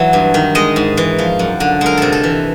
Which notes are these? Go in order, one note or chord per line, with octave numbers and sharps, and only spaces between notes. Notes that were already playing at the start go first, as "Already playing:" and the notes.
Already playing: E3 F#3 E5
G2
D#3
G#3 D#5
G#2
E3
F3
F#2
D3
G#3 A#4
C3 A4
A4
E3